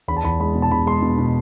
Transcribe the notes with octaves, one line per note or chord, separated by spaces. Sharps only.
E2 B5
A5
E2 B5
G#3 B5
B2
A5
B2 B5
G#3 C6
B2
B2